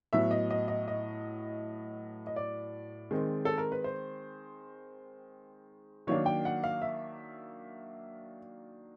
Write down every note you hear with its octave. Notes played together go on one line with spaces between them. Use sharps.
A2 F#3 B3 E5
D#5
D#5
D#5
D#5
D#5
D5
D#3 G#3 C4
A4
A#4
B4
C5
D#3 F#3 A#3 D4 C#5
G5
F#5
F5
E5